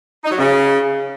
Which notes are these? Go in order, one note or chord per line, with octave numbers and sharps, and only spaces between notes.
D#4
F#3
C#3